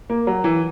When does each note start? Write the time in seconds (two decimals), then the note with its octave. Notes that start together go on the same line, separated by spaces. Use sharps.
0.10 A#3
0.27 F#3
0.44 E3